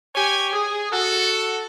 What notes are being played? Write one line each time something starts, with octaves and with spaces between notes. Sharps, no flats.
G4 C#5 G#5
G#4
F#4 A4